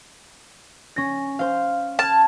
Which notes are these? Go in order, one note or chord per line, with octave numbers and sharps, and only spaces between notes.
C#4 A#6
C5 F5
A5 F6 G#6